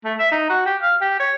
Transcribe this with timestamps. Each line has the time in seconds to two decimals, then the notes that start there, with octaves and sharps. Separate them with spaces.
0.05 A3
0.19 E5
0.32 D#4
0.49 F#4
0.66 G4
0.82 F5
1.01 G4
1.19 C#5